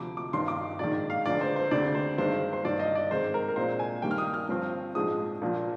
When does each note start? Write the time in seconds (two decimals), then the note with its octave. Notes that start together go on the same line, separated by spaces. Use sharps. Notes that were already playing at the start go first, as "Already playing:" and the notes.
Already playing: D2 C3 F3 D6
0.17 D6
0.33 G1 G2 D#3 C6
0.48 D6
0.79 A#1 G#2 D#3 D5
1.10 F5
1.26 F1 F2 D3 G#3 D5
1.41 C5
1.56 C5
1.71 D2 D3 G#3 C4 D5
1.95 C5
2.18 G2 D#3 G#3 D4 C5
2.53 C5
2.64 G1 G2 D#3 D5
2.80 D#5
2.95 D5
3.10 G#2 D#3 G#3 C4 C5
3.34 A#4
3.48 A#4
3.56 A#1 A#2 G#3 C4 C5
3.79 G#5
4.02 G2 D#3 G3 A#3 G5
4.11 F6
4.18 D#6
4.34 F6
4.49 G1 G2 F3 C4
4.95 A#1 G#2 F3 G#3 D4 D#6
5.42 A#1 A#2 F3 A#3